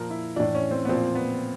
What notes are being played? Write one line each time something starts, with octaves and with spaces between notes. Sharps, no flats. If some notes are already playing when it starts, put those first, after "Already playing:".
Already playing: A#2 F3 A#4
E4
A2 E3 D4
C#4
C4
B3
A#2 F3 C4
B3